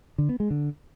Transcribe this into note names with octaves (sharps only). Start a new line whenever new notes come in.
D3
B3
G#3
D3